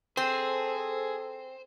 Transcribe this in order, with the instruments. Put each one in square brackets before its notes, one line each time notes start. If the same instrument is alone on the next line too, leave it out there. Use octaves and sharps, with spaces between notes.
[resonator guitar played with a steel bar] C4 [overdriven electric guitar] G#4 [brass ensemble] A4 [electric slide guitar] C5